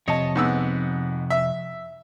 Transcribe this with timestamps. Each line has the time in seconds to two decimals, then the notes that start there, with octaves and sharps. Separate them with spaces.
0.08 F2 C3 C#5 D#5 A5
0.36 G#2 B3 E6
1.30 E5